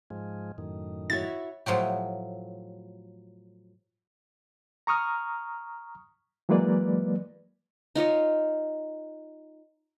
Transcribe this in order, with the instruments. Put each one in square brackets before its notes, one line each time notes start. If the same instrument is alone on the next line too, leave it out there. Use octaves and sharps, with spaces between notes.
[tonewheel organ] G#2 F3 G#3
F#2 A2 D#3
[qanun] E4 F#4 C#5 [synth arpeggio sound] A6
[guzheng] A2 F3 F#3 G4
[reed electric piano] A#5 C#6 D#6 F6
E3 F#3 G#3 A#3 B4 D5
[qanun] D#4 F4 C#5 D#5